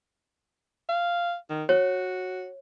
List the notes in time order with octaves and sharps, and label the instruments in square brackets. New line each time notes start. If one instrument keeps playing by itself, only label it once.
[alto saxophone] F5
D#3
[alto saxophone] F#4 [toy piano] C#5